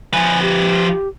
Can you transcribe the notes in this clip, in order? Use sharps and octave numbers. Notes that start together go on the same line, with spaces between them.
F3 B4 G#5
G4